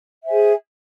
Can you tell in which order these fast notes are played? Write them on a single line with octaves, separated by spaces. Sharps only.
E5 C5 G#5 G#4